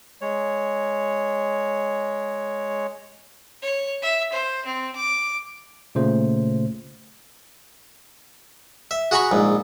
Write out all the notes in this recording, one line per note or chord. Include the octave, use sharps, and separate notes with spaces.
G#3 C#5
C#5
E5
C5
C4
D6
A#2 C#3 A3 C5
E5
F#4 G#4 F#5 A#5 B5 C#6
A#1 G#2